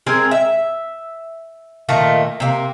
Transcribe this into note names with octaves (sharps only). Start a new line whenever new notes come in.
G#3 C4 G#4 A#4
E5
A#2 D#3 A3 A#3
C3 A#3